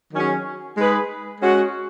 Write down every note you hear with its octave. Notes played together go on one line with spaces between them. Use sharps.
D#3 F#3 C#4 G#4
G#3 D#4 G#4 B4
G#3 C#4 F#4